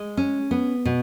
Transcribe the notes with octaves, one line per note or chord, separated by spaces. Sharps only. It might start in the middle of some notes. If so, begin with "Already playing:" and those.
Already playing: G#3
C#4
B3
B2